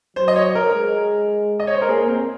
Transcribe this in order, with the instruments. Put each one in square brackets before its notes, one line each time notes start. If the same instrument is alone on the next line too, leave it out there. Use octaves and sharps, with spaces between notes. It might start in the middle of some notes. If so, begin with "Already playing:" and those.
[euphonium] F#3 [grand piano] C5
[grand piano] D#5
C#5
A#4
[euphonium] G#3
[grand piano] D#5
C#5
C5
A#4
[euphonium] A#3 [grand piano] G#4
[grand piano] C4